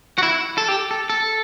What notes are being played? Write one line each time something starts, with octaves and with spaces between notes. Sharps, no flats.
F#4
E4
A4
G4
A4
A4